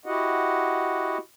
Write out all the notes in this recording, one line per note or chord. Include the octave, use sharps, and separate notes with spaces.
E4 F#4 G4 D#5 F#5